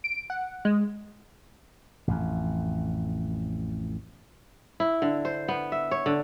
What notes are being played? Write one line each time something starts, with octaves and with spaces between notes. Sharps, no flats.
D7
F#5
G#3
A1 F2
E4
D3
C5
B3
E5
C#5
D3